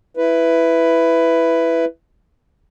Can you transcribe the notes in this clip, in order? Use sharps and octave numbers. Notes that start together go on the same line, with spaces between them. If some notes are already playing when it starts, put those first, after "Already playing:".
E4 B4